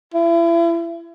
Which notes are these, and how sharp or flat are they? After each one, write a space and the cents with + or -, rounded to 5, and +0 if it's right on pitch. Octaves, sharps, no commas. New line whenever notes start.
E4 +35